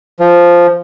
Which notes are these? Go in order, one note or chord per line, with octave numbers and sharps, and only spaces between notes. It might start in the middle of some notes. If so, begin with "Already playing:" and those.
F3